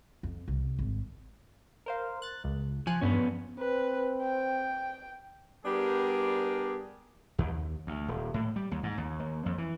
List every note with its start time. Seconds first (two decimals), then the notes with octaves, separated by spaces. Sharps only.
0.23 F2
0.48 C2
0.79 G#1
1.86 A#4 C5 F5
2.22 F#6 A6
2.44 C#2
2.87 F3 G#5 F#6
3.01 E2 G2 F3 B3 C#4
3.59 C4 B4
4.22 G5
5.66 G3 B3 D4 G4 G#4 A#4
7.38 D#2
7.87 D2
8.08 D#1
8.34 A2
8.56 G3
8.71 D#2
8.83 G#2
8.98 D#2
9.20 D#2
9.46 F2
9.58 E3